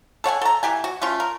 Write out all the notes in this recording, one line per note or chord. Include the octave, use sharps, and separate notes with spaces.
A4 C#5 F#5 G#5
A4 A#5
E3 G4 G#5
F#4
A3 C#4 F4
A#4